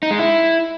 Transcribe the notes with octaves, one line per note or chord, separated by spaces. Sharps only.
D#4
G#3
E4